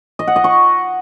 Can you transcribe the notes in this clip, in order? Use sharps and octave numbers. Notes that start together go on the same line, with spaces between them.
D#5
F#5
D#5
C#6